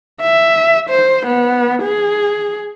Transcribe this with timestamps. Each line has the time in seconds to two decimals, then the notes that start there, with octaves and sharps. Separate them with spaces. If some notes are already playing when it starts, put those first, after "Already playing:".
0.21 E5
0.90 C5
1.26 B3
1.83 G#4